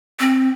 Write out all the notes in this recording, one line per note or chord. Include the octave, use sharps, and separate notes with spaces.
C4